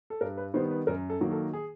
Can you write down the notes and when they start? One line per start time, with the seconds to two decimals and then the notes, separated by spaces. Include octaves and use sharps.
0.10 A4
0.21 G2 A#4
0.37 B4
0.54 D#3 G3 B3 C5
0.71 B4
0.87 F#2 A#4
1.10 A4
1.21 D#3 F#3 A#3
1.31 A4
1.53 G#4